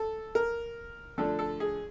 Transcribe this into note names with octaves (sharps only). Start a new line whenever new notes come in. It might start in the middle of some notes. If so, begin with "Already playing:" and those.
Already playing: A4
A#4
D3 F3 A3 D4 A4
A4
G#4